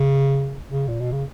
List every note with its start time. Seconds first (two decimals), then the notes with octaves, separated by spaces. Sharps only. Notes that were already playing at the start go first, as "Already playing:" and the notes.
Already playing: C#3
0.70 C#3
0.88 A#2
1.00 B2
1.12 C#3